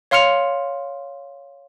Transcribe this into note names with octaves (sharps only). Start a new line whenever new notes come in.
C#5 F5 C6 F6 C#7 F7